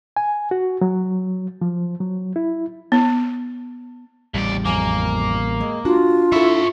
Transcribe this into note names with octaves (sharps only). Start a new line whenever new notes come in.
G#5
F#4
F#3
F3
F#3
E4
B3
A1 D#2 G3 D5
F2 A#3 G#5
G#3
D4 F4 F#4
E4 A4 C#5 E5